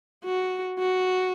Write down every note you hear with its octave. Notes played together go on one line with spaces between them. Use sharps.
F#4
F#4